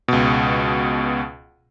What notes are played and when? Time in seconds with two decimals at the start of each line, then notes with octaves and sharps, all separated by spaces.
0.08 C#2 B2